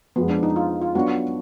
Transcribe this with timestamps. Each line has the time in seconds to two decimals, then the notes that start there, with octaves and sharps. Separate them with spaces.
0.16 F2 F3 G#3 B3
0.30 D4
0.43 D#4
0.56 F4
0.82 F4
0.95 F#3 B3 D4 F#4